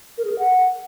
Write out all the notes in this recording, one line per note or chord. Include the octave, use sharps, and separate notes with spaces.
A#4
G#4
A#4
F#5